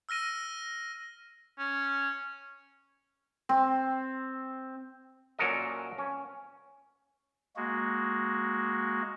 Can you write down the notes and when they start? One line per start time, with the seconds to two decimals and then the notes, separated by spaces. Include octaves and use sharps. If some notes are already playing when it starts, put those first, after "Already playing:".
0.09 E6 F6 A#6 D#7
1.59 C#4
3.49 C4
5.39 A#2 F#3 C#4 A4 A#4 D#5
5.98 C#4
7.56 G#3 A#3 F#4